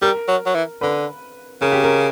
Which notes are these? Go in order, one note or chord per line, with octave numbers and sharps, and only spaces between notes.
G3 A#4
F#3
F#3
E3
D3 B4
C#3 A#4
G4
A#4